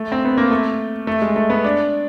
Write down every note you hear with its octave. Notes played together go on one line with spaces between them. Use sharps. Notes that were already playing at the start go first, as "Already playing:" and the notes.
Already playing: A3
C4
B3
A#3
A3
A3
G#3
A3
B3
D4